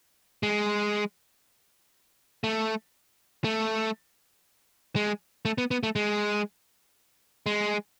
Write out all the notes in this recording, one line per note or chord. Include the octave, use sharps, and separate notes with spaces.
G#3
A3
A3
G#3
A3
B3
B3
A3
G#3
G#3